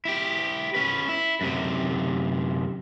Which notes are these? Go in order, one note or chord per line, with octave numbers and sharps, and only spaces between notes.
E4 G4
C#4 B4
E4
F#2 C3